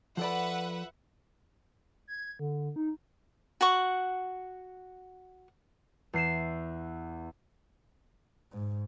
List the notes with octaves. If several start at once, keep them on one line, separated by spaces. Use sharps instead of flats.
F3 A4 B4 D5 E5 F#5
G#6
D3
D#4
F#4 F#5 C#6
E2 C7 E7
G#2